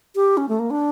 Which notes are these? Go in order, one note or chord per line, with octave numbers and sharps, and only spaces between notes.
G4
C#4
A3
A#3
D4